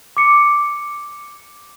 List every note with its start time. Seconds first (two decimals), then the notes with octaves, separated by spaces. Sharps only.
0.17 D6 C#7